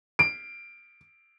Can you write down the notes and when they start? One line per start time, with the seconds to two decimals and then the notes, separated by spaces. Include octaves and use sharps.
0.19 D7